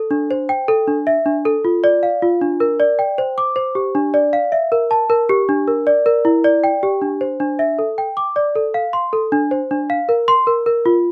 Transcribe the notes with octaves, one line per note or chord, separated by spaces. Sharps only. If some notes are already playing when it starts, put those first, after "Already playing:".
Already playing: A4
D4
C5
G5
A4
D4
E5
D4
A4
F4
D5
F5
F4
D4
A#4
D5
G5
C5
D6
C5
G4
D4
D5
F5
E5
A#4
A5
A#4
G4
D4
A#4
D5
A#4
E4
D5
G5
G4
D4
C5
D4
E5
A4
G5
D6
D5
A4
F5
C6
A4
D4
C5
D4
F5
A#4
C6
A#4
A#4
F4